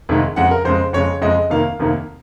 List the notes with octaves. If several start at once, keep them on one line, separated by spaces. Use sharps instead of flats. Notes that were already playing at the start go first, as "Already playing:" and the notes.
F1 D#2 D#3 G#3
F2 C#3 G#3 F#5
A#4
F2 C#3 G#3 C5
F2 C#3 G#3 C#5
F2 C#3 G#3 D#5
F1 D#2 D#3 A#3 F5
F1 D#2 D#3 A#3